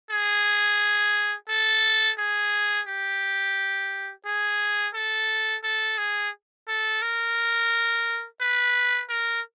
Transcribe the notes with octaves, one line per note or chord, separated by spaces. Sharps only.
G#4
A4
G#4
G4
G#4
A4
A4
G#4
A4
A#4
B4
A#4